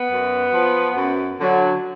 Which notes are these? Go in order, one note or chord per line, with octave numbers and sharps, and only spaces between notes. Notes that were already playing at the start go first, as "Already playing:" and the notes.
Already playing: B3
F#2
F3
F#2
D3 F#3